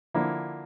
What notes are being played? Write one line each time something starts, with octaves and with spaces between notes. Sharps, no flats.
D3 F3 A#3 E4